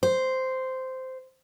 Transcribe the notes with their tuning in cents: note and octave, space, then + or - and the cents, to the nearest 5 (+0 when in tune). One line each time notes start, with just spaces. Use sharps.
C5 -10